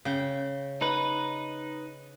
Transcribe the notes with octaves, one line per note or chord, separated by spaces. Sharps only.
C#3 G5
D#4 B4